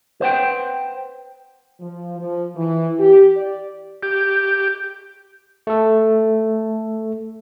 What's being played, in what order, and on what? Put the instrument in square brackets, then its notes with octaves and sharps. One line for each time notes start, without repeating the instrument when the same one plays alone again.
[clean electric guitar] B4 C5 F#5 G5
[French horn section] F3
F3
E3
G4
D5
[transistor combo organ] G4
[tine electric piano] A3 A4